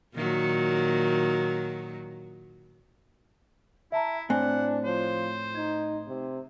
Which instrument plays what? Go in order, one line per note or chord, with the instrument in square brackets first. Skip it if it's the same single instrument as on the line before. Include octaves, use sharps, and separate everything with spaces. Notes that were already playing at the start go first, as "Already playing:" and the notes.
[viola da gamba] A#2 D#3 F#3
[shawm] E4 [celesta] E5 A5 A#5
[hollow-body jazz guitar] A2 C4 [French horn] D4 [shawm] F#5 [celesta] G#5
[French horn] F3 [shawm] C5 [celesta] C#5
[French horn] D#4 [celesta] G#6
[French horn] C3